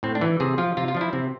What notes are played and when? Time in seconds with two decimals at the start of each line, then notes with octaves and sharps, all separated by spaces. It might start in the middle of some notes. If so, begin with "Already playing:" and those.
0.03 A2 C4
0.15 D4
0.21 E3
0.40 C3 G#4
0.58 F3 F4
0.77 C3 F4
0.88 F4
0.95 F3 D4
1.01 E4
1.13 C3 C4